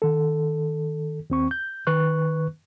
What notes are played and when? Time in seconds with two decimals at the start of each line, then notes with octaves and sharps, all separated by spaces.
0.02 D#3 A4
1.30 D#2 C4 C#6
1.51 G6
1.87 D#3 B4 C#6 F#6